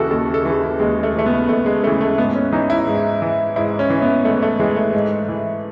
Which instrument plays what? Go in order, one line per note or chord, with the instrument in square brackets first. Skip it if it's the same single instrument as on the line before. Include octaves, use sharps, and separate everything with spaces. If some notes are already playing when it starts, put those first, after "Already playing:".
Already playing: [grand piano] D#2 C#3 E3 E4 F#4 A4
D#2 A4
A4
C#3 E3
D#2 G#3
A3
C#3 E3 A3
B3
D#2 A3
G#3
C#3 A3
E3
A3
G#2 B3
C#4
E3 D#4
E4
G#2
E3
G#2 E4
C#4
E3
B3
G#2 A3
A3
E3 G#3
A3
G#2
E3